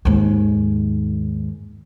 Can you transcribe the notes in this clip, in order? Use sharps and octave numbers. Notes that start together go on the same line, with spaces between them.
D#2 G#2